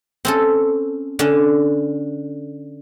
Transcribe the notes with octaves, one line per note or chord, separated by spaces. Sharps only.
C4 C#4 A4
D3 C#4